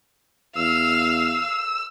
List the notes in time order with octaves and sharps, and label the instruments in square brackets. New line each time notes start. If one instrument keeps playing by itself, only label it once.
[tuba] E2 [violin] F5 [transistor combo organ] E6